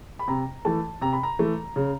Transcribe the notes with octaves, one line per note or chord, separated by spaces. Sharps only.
B5
C3 A#5
E3 A3 A5
C3 A#5
B5
A#5
E3 A3
C#3